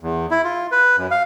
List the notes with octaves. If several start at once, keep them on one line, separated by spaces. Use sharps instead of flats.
E2
E4
F4
B4
F#2
F5